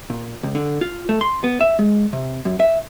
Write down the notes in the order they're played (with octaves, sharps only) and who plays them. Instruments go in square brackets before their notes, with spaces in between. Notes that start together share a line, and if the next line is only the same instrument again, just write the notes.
[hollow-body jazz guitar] A#2
C#2
D3
F4
A3
C6
B3
E5
G#3
C3
F#2
E5